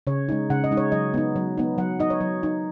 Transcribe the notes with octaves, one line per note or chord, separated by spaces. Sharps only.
C#3 C#5
G#3 D#4
C#3 F#5
D#5
G#3 D#4
C#5
F#3 D#5
B3 D#4
F#3
B3 D#4
F#3 F#5
D#4 D#5
C#5
F#3
D#4